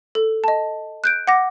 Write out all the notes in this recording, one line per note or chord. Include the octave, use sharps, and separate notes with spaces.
A4
D#5 A5
F#6 G6 D7
F#5 D6 A#6